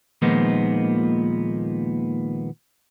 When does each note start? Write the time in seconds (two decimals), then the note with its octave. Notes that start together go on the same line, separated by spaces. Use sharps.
0.22 D#2 A#2 D#3 F3 G#3 B3